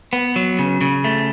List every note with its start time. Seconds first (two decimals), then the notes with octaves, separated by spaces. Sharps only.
0.13 B3
0.36 F#3
0.59 C#3
0.81 C#3
1.05 A3